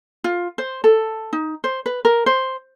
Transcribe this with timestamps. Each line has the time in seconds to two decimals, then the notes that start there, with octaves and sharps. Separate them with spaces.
0.24 F4
0.58 C5
0.84 A4
1.33 D#4
1.64 C5
1.86 B4
2.05 A#4
2.26 C5